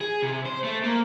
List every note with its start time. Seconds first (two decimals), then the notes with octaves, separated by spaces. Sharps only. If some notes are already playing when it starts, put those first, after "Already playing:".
0.01 G#4
0.22 C3
0.45 C5
0.64 A3
0.84 A#3